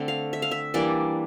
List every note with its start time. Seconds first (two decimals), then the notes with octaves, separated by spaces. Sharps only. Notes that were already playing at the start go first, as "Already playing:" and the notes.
Already playing: D3 A3 C4
0.08 F5
0.33 E5
0.42 F5
0.51 E5
0.74 E3 G3 A#3 D4 D5